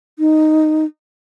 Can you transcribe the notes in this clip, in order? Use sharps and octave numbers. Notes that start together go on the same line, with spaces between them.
D#4